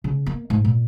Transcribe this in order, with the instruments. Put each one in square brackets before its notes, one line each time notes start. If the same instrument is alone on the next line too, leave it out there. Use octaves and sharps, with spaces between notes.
[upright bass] C#3
A#3
G#2
A#2